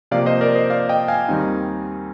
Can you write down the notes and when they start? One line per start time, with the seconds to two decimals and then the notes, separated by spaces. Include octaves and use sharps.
0.11 C3 F3 A#3 D5 F5
0.26 C5 D#5
0.41 A#4 D5
0.55 C5 D#5
0.70 D5 F5
0.89 D#5 G5
1.08 F5 G#5
1.28 D#2 D#3 G3 C4 D#4